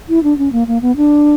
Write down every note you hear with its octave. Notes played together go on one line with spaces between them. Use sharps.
E4
D4
C#4
A#3
A#3
B3
D4